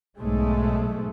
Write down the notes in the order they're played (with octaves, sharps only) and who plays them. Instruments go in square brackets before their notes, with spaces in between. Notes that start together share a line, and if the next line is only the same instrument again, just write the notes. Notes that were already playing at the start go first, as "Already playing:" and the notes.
[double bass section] B1 G#2 G#3 A3